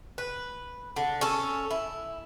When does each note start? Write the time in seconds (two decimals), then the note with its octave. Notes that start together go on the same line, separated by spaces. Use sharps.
0.18 B4
0.96 D3
1.21 C#4 A4
1.71 E4